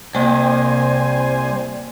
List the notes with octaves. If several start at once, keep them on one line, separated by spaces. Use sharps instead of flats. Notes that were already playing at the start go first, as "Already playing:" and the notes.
C2 A#3 C5 D5 G5 G#5